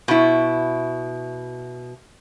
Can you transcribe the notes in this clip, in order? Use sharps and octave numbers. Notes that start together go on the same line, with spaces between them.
B2 E4